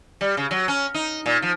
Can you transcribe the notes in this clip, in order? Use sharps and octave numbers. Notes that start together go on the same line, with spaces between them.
G3
C#3
F#3
C#4
D#4
A#2
F3